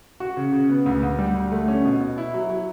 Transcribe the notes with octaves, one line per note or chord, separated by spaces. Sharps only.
F#4
C#3
C#3
B3
D2
D2
G3
D2
A3
C#4
B2
B2
E4
F#3
F#3